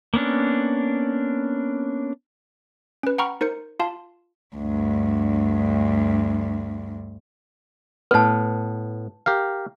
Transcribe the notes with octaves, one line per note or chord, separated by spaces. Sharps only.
A#3 B3 C#4 D4
C#4 B4
F#5 G5 A#5 B5 C#6 F6
D#4 A#4 C5 C#7
F4 F5 A5 C6
D2 G2
A2 B3 B4 A5
G4 A#4 F5